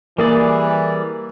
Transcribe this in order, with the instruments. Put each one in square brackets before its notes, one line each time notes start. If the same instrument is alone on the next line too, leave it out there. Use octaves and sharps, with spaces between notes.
[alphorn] E3 [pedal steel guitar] G3 G#4 D5 [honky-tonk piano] A#3